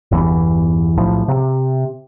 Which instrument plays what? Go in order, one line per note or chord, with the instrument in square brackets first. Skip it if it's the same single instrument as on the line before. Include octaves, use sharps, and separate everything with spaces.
[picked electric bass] G1 E2 E3
B1 A2 F3
C3